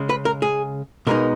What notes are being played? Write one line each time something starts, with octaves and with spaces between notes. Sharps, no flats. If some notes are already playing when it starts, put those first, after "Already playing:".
Already playing: C#3 G#3 C#4
B4
A#4
G#4
B2 G#3 B3 D#4 A#4